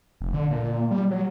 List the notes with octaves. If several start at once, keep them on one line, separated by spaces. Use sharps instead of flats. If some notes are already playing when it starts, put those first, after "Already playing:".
F1
D3
A#2
G3
F#3